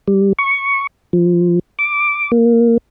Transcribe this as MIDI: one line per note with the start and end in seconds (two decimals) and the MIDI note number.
0.08 0.33 55
0.39 0.87 85
1.13 1.59 53
1.79 2.31 86
2.32 2.78 58